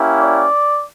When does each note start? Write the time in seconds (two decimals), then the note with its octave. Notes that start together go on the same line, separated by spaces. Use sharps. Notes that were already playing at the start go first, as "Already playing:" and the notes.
Already playing: A#3 C#4 E4 G4
0.18 D5